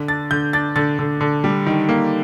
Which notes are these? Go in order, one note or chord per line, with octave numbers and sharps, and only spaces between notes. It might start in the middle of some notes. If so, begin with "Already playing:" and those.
Already playing: D3
D4 A6
D3 G6
D4 A6
D3 A6
D3
D3
G3
D#3
A#3